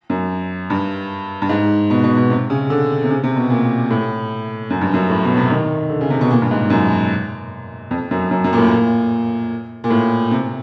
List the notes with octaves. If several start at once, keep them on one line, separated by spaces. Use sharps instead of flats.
F#2
G2
G2
G#2
B2
B2
B2
C3
C#3
D3
C3
C#3
C3
B2
A#2
A2
F#2
G2
F#2
A2
B2
C3
D#3
D3
C#3
C3
B2
A#2
G2
G#2
F#2
F2
F#2
F#2
F#2
A#2
A2
A#2
A#2
A2
C3